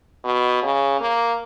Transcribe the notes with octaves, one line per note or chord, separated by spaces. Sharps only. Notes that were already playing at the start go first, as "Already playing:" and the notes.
B2
C#3
A#3